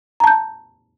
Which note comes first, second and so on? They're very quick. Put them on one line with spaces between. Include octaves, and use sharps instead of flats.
A#5 A5 G6